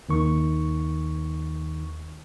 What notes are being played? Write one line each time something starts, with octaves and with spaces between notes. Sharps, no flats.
D#2 D#3 C#6